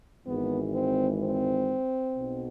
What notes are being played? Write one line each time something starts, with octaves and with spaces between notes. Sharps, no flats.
G#1 G#2 E3 B3
C4
C4
B1 B2